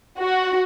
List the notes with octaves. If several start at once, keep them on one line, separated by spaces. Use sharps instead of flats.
F#4